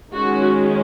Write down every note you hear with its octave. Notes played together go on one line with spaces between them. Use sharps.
D#3 G#3 C#4 F#4